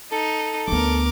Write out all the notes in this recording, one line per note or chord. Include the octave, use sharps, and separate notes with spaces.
D#4 A4
D2 B3 A#4 D6